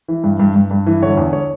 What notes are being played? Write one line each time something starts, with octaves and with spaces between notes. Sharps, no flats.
E3
G2
G2
G2
G2
E3
D3 C#5
E2
C#5